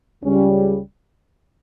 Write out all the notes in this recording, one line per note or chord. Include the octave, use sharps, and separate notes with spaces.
C#2 C#3 G3 C#4